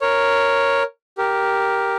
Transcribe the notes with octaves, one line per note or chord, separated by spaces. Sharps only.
A#4 C#5
G4 A#4